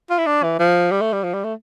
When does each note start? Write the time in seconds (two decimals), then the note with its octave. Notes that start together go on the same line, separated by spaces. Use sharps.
0.10 F4
0.18 E4
0.26 D4
0.43 E3
0.59 F3
0.91 G3
1.01 A3
1.13 G3
1.23 F3
1.33 G3
1.44 A3